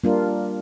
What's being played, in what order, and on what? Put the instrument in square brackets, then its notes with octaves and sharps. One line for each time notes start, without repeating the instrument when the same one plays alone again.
[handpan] G3 A#3 D4 F4 A#4